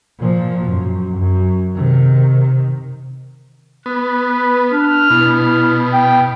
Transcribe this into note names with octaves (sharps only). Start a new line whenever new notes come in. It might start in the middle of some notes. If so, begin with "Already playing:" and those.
A#2 F3
F#2
F#2
C3 D#3
B3 F#6
B4
D4 F6
B2 E4
G5